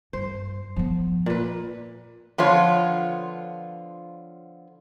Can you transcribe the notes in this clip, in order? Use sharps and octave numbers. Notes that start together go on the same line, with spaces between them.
G2 C5
F3 B3
A#2 B4
D3 F3 B3 F4 C#5